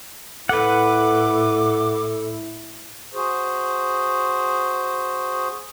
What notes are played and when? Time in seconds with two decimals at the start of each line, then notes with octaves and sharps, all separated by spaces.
0.49 A2 E4 A4 B4 F#5 D6
3.14 F#4 G#4 C5